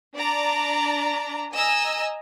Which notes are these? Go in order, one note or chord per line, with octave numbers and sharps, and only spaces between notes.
D4 D5 A#5
D#5 G#5 A#5 E6